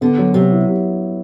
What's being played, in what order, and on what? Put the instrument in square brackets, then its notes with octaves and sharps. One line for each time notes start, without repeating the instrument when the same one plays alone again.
[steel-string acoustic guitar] D3 [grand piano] B3
[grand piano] F#3
[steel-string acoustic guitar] C3 [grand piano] F#3
[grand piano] E4